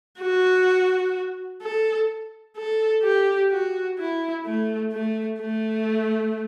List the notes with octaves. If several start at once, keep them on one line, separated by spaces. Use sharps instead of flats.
F#4
A4
A4
G4
F#4
E4
A3
A3
A3